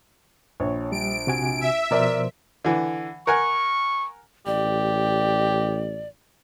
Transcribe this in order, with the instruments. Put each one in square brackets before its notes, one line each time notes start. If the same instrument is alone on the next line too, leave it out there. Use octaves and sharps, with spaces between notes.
[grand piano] A#1 [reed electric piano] C#5
[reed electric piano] G3 [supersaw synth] D7
[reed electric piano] C3 F#4 G#5
[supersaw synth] E5
[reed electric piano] B2 F3 C5 [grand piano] A#4 D5
[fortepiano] D3 E3
[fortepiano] A#4 F#5 G#5 [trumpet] C#6
[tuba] A1 [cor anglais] G4 [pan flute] D5